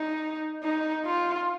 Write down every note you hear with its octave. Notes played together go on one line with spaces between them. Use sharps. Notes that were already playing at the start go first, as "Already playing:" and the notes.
Already playing: D#4
D#4
F4